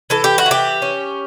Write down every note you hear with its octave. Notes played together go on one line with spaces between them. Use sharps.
E3 A4
G4
F#4
E3
G4
C#4